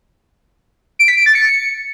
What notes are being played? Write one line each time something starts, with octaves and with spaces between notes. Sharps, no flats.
D7
B6
D7
A6
C#7